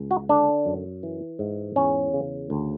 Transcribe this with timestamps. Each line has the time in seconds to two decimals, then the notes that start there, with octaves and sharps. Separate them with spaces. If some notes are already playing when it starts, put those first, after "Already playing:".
Already playing: C#2
0.11 F#4
0.29 D3 D4
0.66 F#2
1.03 E3
1.39 G#2
1.76 E2 C#4
2.14 C#3
2.50 D2